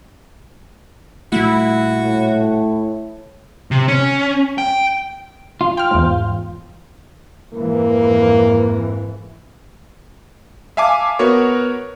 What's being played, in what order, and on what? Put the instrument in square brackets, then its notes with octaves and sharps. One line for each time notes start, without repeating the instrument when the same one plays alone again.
[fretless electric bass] A#2 G3 A3 [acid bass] E4 [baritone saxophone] F#4
[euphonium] A2
[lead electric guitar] C3
C#4
G5
[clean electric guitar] F4
[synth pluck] G5 F6
E2 G#2
[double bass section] F2 G#2 E3 [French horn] A#3
[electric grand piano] E5 F5 G#5 A5 D6
B3 F#4 A#4 C#5